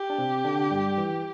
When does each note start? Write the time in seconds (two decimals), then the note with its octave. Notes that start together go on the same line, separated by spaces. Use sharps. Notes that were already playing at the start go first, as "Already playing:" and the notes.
Already playing: G4
0.10 D4
0.19 C3 C4
0.45 D3 D4
0.71 G2 G3
0.97 E3